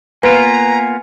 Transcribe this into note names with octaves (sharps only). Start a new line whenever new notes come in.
A#3 B3 F4 B4 G#5 A#5